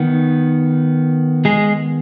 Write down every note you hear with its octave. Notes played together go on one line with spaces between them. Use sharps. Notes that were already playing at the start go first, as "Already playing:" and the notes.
Already playing: D#3 B3
G#3 G#4